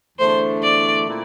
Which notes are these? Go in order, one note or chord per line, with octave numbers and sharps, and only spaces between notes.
E2 D3 A3 D4 C5
D5
A#2 A3 C4 E4